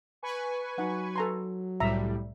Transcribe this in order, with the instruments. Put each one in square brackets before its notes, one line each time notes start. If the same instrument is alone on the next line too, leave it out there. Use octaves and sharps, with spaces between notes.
[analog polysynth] B4 G#5 C#6
[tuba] F#3 [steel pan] D#4 F#5
[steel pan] A4 A#5 C6
[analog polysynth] C2 A2 G3 [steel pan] E5 A#5